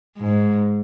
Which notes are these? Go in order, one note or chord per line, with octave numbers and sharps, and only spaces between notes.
G#2